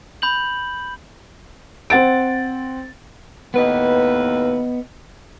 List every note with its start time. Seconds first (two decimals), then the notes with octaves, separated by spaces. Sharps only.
0.22 B5 G6 F#7
1.90 C4 F#5 A6 D7
3.54 D#2 A2 B3 B4 D#5